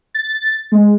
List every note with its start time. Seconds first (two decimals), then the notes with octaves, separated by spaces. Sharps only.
0.14 A6
0.72 G#3